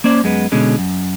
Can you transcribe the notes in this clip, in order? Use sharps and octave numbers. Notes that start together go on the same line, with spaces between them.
A#3 C#4 C5 D5
F#2 G#3 B3
B2 D3 G#3 C#4
F#2